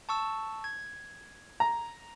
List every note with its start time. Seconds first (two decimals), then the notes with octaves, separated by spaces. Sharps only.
0.09 A5 C#6 E6
0.64 G#6
1.60 A#5